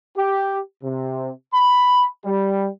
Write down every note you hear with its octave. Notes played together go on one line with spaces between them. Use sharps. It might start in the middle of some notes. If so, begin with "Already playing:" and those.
G4
C3
B5
G3